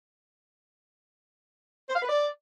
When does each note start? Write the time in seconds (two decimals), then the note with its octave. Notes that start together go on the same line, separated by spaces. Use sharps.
1.89 C5
1.95 F5
2.02 B4
2.09 D5